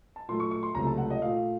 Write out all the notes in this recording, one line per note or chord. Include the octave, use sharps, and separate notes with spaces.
A5
A#2 F#3 A3 C6
C#6
C#6
C6
C#2 C3 F#3 A3 A#5
A5
F#5
D#5
A#2 A3 F5